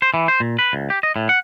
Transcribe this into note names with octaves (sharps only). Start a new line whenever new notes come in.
C5
E3
C5
A#2
B4
C#2
G4
D#5
A2
F#5